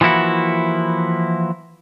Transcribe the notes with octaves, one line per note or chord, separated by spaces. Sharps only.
E3 F3 A#3 E4 F#4